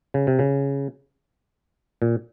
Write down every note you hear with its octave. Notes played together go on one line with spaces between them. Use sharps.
C#3
C3
C#3
A#2